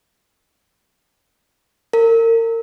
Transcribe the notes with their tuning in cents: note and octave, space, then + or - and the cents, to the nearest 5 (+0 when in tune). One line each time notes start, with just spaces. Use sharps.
A#4 -30